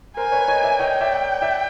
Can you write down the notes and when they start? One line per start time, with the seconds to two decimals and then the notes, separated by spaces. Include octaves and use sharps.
0.17 A#4 C5 G#5
0.32 B4 C#5
0.48 C#5 D#5
0.63 D5 E5
0.79 C#5 D#5 G5
1.01 D5 E5
1.42 D5 E5